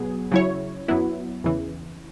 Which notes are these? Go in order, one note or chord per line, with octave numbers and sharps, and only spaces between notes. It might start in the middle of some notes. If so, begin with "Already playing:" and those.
Already playing: B2 F#3 B3 G#4
C#3 F#3 E4 C#5
F#2 F#3 B3 E4
E2 C#3 E3